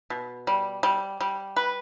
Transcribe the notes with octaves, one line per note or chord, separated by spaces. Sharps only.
B2
G3
G3
G3
B4